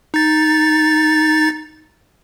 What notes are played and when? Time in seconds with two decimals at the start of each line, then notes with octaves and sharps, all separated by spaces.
0.14 D#4 A6